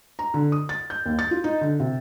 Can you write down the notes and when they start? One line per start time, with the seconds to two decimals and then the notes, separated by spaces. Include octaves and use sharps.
0.19 A#5
0.34 D3
0.52 D#6
0.69 A6
0.90 G6
1.06 D#2
1.19 A6
1.31 F4
1.44 D#4
1.61 D3
1.80 C3